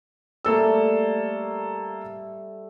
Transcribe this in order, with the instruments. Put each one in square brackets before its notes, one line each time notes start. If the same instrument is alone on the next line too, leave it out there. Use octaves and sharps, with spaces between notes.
[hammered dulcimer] G3 A3 [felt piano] A#3 A4 E6